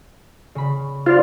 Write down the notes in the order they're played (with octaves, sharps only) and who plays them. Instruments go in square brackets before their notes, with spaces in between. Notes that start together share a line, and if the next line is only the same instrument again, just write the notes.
[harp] C#3 B5
[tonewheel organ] F4 [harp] C5 D5 F5